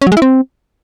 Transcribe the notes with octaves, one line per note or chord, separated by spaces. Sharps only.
C#4
F#3
G#3
E4
C4